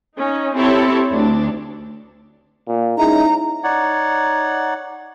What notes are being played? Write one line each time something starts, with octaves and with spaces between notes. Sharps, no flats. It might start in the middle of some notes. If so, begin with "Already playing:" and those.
C#4 D#4
C4 E4 G4 A4 C#5
D2 D4
A#2
G#3 C#4 D#4 E4 A#5
D#4 C#5 D5 F#5